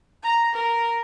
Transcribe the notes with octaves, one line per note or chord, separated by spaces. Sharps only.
A#5
A#4